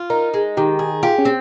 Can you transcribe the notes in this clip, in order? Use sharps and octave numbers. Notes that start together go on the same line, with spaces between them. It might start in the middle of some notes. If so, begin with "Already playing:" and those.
Already playing: F4
D#4 A#4
G#3
D#3 G4
G#4
F4 G4
C#4
C4